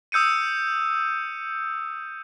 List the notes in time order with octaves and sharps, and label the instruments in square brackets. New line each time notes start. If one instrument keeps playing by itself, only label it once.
[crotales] D#6 E6 G6 C#7 D#7